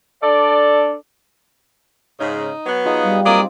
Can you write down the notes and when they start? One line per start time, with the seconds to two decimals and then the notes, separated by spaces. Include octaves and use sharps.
0.22 D4 A4 D5
2.20 G#2 C#3 D#4
2.66 F#3 B3
2.85 D#4 F4 G#4
3.03 G3
3.26 F#3 A#3 C4 D#4 F4 D5 D6 D#6